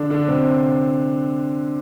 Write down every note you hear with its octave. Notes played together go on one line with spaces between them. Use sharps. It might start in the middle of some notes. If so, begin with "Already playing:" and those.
Already playing: D3 D4
D3 D4
C3 C4